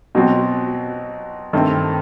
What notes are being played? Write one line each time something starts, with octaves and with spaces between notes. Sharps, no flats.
B2 F#3 C4 F#4
G2 D#3 A3 C4